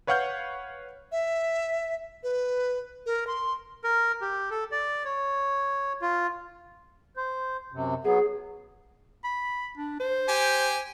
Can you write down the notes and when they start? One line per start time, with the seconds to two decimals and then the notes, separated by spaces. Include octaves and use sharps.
0.07 B4 C#5 F5 F#5 F6 G6
1.12 E5
2.23 B4
3.06 A#4
3.27 C6
3.84 A#4
4.22 G4
4.51 A4
4.72 D5
5.05 C#5
6.01 F4
7.17 C5
7.72 F#2 C3
8.05 F#3 B3 G#4
9.24 B5
9.77 D4
10.00 C5
10.29 G4 G5 G#5